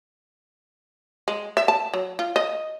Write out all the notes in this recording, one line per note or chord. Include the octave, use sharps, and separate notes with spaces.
G#3
E5
A5
F#3
F4
D#5